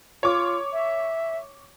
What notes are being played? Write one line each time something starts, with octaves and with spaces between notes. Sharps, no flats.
F4 C#5 D6
E5